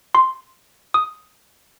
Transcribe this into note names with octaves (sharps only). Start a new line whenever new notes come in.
C6
D#6